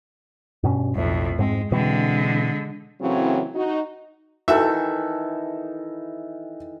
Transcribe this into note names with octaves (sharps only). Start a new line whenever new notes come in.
G2 B2 C#4
B1 F2 A2 A3
G#2 G#3 B3 C4
B2 D3 E3 G#3 C4
A2 C#3 E3 F#3 C4
D#4 F#4
D#3 E3 F#4 A4 E5